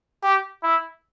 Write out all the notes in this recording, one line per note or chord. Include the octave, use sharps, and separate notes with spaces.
G4
E4